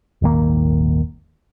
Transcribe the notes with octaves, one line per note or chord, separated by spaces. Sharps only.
D#1 G#1 D#3 A#3